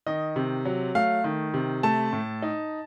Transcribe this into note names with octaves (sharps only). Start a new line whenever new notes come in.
D#3 D#5
C3
F#3
A3 F5
D#3
C3
A3 A5
A2
D#4